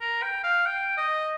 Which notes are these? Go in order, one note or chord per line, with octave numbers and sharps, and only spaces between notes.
A#4
G5
F5
G5
D#5